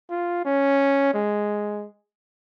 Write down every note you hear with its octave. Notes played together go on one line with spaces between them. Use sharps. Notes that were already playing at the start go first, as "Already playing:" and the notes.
F4
C#4
G#3